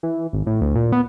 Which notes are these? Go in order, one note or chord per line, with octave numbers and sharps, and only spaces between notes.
E3
G#1
A2
D2
A#2
B3